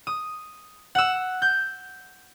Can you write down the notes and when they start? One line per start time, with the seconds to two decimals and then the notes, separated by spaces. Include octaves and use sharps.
0.07 D#6
0.95 F#5 E6
1.42 G6